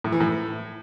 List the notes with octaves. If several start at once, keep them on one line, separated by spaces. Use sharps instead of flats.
A2
E3
A2